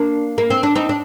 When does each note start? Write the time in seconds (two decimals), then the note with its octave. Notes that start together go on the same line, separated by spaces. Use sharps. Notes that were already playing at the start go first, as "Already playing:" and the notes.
Already playing: A#3 D4
0.38 A#3
0.50 C4
0.63 D4
0.75 C4 D#4
0.89 D4